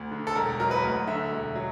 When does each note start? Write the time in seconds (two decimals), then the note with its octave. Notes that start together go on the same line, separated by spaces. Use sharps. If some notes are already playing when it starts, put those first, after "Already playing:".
Already playing: D2
0.11 D3
0.27 A4
0.36 E1 A#4
0.60 F#3 A#4
0.71 B4
0.84 D2
1.07 D3 E5
1.31 E1
1.55 F#3